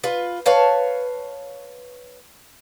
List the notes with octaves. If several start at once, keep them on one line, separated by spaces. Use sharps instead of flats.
F4 B4
B4 C#5 F5 A5